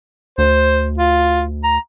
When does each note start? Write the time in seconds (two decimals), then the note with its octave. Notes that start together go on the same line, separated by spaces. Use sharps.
0.38 D2 C5
0.98 F4
1.64 A#5